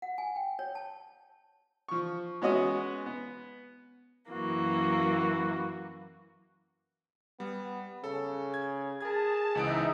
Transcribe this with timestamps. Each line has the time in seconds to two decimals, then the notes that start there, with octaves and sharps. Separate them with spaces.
0.02 F#5
0.18 G#5
0.36 G5
0.59 C#5
0.75 A5
1.88 F3 C#6
2.42 G#3 B3 C#4 F#4 D#5
3.06 B3
4.32 F#2 E3 A#3 F#4
7.40 G3 B3
8.04 C#3 A4
8.54 G#6
9.01 G#4 A#4 A5 G#6
9.55 C#2 G#2 E3 D#4 D#5 E5 D7